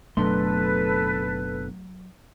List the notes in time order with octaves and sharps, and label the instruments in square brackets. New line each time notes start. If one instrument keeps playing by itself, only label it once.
[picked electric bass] F#1 B2 D4 [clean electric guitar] F#3 C6 [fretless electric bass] A3 [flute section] A4 B4